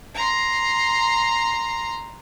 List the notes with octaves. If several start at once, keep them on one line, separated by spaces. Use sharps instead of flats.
A#5 C6